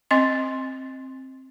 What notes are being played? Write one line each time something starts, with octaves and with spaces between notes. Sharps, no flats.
C4 D#5 C6